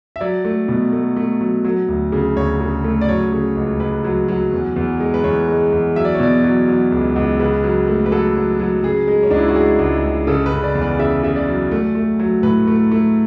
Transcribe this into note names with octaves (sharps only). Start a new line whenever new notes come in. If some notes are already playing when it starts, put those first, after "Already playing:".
E5
F#3 D5
A3
B2
A3
A3
F#3
F#3
D2
C#3
D2 C#5
C#3
A3
D5
F#3 C#5
C#3
C#2
C#2 B4
F#3
F#3
E2
E2
G#3
B4
E2 C#5
G#3
E2
F#3 E5
D5
C#5
B2 D5
F#3
F#3
C#2
C#2
C#3 B4
F#3
A3
B4
F#3 A4
F#3
F#3
C#3 G#4
G#3
C#4
C#2 D4
E4
F#4
G#3 G#4
C#2
C#2
C#3 A4
B4
C#3
D5
E2
D5
C#3 E5
C#3 E5
D5
F#3
A3
A3
F#3
A2 B4
A3
A3